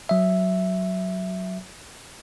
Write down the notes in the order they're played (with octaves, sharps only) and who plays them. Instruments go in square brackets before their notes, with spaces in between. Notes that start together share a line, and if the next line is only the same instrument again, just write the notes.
[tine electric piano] F#3 E5